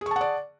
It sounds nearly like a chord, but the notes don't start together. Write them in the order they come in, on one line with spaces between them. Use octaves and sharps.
G#4 C#6 A5 F#5 D5